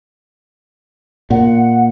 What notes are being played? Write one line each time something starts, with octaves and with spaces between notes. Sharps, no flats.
A#2 F#5